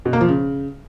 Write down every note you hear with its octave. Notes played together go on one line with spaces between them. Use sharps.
B2
A#3
F3
C#3